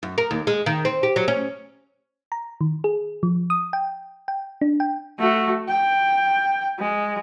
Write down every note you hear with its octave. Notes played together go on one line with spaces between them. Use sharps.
F#2
A#4
D#2
G#3
D#3
C4
G4
F#3
C#4
A#5
D#3
G#4
F3
D#6
G5
G5
D4
G5
A3 F#4
G5
G#3